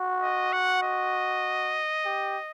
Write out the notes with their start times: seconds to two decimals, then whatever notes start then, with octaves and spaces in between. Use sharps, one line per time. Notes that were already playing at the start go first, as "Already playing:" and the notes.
Already playing: F#4
0.22 D#5
0.53 F#5
0.83 D#5
2.05 G4